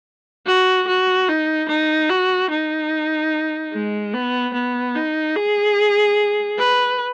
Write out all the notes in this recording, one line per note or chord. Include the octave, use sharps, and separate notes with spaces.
F#4
F#4
D#4
D#4
F#4
D#4
G#3
B3
B3
D#4
G#4
B4